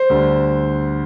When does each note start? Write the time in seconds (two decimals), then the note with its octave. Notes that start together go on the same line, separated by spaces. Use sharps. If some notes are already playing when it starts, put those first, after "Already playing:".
Already playing: C5
0.10 D2 D3 G3